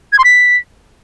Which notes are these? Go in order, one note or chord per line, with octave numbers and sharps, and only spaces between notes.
G#6
C6
B6